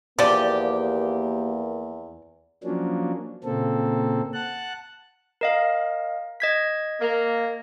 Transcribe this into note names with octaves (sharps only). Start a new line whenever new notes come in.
E2 F3 A#3 G4 D5
F3 F#3 A#3 C#4 D4
A#2 C#3 A#3 C4 A4
F#5 A5 F#6
A#4 D#5 F5
D#5 G#6 B6
A#3